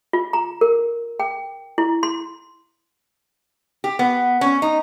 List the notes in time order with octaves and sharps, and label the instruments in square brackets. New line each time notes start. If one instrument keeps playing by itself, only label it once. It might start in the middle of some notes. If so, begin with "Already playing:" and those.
[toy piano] F4
A#5
A#4
G5
E4
C6
[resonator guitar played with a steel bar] G4
B3
C#4
D#4